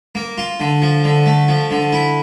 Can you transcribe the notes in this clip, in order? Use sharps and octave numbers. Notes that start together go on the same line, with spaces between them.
A#3
F4
D3
F3
D3
A3
F3
D3
E4